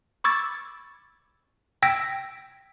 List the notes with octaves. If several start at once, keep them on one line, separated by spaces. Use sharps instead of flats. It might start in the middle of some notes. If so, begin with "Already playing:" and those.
B5 C#6 D6 E6 G#6 A6
G5 E6 G#6 A#6 B6 D7